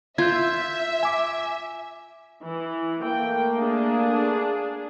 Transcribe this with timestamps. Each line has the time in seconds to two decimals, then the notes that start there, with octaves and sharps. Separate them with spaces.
0.18 F4 E5 G6 G#6
1.03 G#5 D6
2.45 E3
3.04 A3 A#3 G5
3.58 D4 G#4